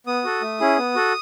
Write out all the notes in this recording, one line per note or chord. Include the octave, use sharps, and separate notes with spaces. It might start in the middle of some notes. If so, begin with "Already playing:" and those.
B3 D#6
F#4 A4
A3
C#4 E4 G#4
B3
F#4 A4